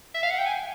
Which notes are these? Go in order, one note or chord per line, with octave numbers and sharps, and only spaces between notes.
E5
F5
F#5
G5
G#5